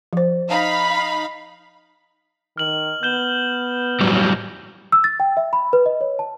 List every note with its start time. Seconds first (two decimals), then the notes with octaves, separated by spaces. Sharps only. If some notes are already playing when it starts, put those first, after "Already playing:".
0.13 F3 C5
0.49 D#4 F5 B5
2.57 D#3 F6 F#7
3.03 B3 G6 E7 G7
4.01 A2 F#3 G3
4.92 E6
5.04 A6
5.20 G5
5.37 E5
5.53 B5
5.73 B4
5.86 D#5
6.01 C#5
6.19 A5